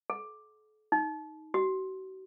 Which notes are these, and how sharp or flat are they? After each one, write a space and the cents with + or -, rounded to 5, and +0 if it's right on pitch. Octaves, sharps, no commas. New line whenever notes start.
A4 -40
D#4 +10
F#4 +40